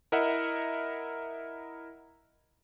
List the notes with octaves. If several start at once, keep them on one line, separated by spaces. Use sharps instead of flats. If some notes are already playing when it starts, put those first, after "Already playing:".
E4 A#4 D#5 E5 F#5